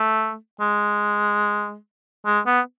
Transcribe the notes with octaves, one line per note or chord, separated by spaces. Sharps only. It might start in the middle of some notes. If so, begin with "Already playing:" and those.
Already playing: A3
G#3
G#3
B3